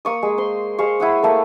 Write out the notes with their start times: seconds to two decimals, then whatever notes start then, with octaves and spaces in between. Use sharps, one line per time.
0.05 A#3 C#6 D#6
0.23 G#3
0.38 C5 C6
0.78 G#3 C5 F5 C#6
1.00 E4 F#5 D#6
1.23 A3 A#3 A#4